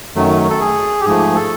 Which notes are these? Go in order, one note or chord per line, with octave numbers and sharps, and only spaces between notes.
F#2 D#3 F#3 A3
A4
G#4
G4
G#2 F3 A3 G#4
A4